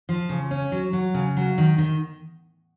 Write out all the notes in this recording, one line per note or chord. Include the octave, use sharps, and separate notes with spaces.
F3
C#3
C#4
F#3
F#3
C#3
F#3
D#3
D#3